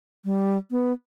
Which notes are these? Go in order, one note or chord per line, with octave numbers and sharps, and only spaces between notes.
G3
B3